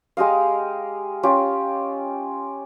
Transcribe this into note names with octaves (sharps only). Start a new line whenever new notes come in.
G#3 G4 D#5 F5
C#4 F4 G4